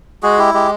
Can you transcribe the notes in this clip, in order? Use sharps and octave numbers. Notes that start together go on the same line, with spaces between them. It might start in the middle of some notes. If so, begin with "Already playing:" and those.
G#3 F#4 G#4
E4 G4
G#3 G4